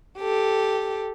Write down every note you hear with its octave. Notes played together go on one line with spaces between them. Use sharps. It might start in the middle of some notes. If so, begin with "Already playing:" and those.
G4 A4